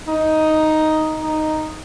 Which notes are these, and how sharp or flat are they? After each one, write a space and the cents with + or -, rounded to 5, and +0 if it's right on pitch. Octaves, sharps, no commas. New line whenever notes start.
D#4 +5
D#4 -5